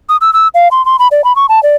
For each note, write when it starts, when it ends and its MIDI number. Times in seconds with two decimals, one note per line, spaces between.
0.09 0.17 87
0.21 0.33 88
0.33 0.48 88
0.54 0.68 77
0.71 0.84 84
0.86 0.97 84
0.99 1.08 83
1.11 1.24 74
1.24 1.35 83
1.36 1.46 85
1.49 1.62 81
1.63 1.76 74